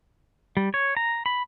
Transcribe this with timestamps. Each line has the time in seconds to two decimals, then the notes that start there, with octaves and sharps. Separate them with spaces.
0.57 G3
0.74 C#5
0.97 A#5
1.26 B5